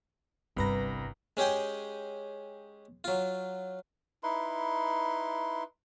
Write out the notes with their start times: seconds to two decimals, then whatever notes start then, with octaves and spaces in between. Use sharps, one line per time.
0.57 G1 C2 G2 C3 B4 A#5 A#6
1.37 G#3 C#4 G4 G#4 G5
3.04 F#3 F4
4.23 D#4 E4 B4 C6